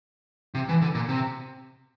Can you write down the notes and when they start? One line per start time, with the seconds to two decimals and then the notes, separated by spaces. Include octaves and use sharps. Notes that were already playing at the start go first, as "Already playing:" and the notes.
0.55 C3
0.69 E3
0.82 D3
0.95 A#2
1.09 C3